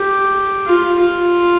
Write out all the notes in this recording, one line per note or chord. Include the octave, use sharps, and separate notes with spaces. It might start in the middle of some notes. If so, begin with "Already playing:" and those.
Already playing: G4
F4
F4